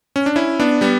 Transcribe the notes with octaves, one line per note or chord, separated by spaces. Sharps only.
C#4
D4
C#4 E4
B3 D4
G3 B3